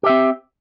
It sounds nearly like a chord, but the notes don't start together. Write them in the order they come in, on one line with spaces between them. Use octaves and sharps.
G4 E5 C4